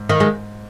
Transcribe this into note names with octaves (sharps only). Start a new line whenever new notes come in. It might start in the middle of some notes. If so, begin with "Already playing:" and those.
Already playing: G#2
D#3
G#3